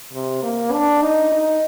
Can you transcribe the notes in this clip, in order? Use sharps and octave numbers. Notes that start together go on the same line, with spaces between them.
C3
A#3
D4
D#4
D#4